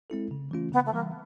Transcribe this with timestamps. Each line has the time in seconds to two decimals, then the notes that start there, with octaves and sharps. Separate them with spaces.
0.10 G#3 C4 E4 A4
0.31 C#3
0.51 E3 A3 C#4 F4
0.72 C#3 B3
0.86 A3
0.94 E3 G3 A#3